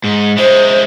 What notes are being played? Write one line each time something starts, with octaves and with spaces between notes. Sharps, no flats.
G#2
G#3 E4 C5